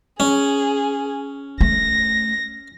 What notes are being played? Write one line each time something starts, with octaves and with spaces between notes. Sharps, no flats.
C#4 G#4
A3 A#6